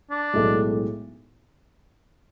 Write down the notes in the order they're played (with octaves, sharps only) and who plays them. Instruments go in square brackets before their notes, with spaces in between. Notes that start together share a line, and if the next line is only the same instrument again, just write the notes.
[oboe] D4
[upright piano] B1 A2 G#3